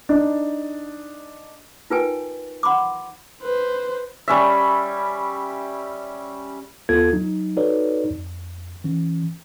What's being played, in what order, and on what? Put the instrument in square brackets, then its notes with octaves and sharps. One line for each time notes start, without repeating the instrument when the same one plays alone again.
[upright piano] D4 D#4
[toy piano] D#4 F4 A#4 B4 G5 G#5
F#5 B5 C6 D6
[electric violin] B4 C5
[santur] G3 C#4 E5
[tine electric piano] D#2 B3 F4 A4 G#6
F#3 D#4
D#4 F#4 A4 B4 C#5 D5
F2
E3 C#4